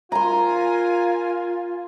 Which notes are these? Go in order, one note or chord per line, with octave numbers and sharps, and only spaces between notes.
F4 A#4 G#5 A#5 C6